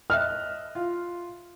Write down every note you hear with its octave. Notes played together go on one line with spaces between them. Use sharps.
D#5 E5 F6 F#6
F4